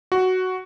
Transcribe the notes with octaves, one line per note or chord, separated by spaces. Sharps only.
F#4